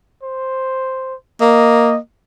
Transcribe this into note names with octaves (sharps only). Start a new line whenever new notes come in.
C5
A#3 D#5